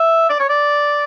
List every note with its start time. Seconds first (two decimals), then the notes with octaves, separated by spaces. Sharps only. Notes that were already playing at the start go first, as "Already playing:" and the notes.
Already playing: E5
0.30 D5
0.40 C#5
0.49 D5